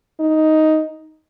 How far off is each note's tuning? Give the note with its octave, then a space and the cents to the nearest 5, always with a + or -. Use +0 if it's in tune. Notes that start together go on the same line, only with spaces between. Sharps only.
D#4 +5